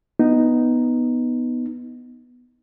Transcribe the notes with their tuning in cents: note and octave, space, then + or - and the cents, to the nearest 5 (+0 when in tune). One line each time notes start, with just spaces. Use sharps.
B3 +0 D#4 +0